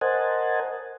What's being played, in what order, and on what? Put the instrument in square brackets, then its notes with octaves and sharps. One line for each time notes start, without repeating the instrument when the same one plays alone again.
[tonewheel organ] A#4 C5 D#5 F#5 G#5 A5